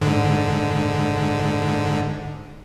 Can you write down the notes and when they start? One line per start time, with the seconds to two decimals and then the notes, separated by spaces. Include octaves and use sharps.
0.01 G#2 D3